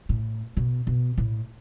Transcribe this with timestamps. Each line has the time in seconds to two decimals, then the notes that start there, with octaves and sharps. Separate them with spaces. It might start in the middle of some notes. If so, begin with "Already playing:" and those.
0.09 A2
0.57 B2
0.87 B2
1.18 A2